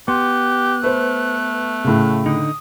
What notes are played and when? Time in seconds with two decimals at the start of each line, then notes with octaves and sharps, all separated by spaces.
0.08 B3 G4 C6 F#6
0.84 A3 B4 C5
1.84 A2 C#3
2.26 D3 D#4 D#6